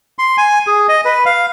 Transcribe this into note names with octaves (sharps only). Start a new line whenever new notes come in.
C6
G#5
G#4
D#5
B4
F5